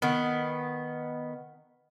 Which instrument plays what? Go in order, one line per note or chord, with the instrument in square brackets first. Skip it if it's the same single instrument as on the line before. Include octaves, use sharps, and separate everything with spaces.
[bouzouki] D#3 B3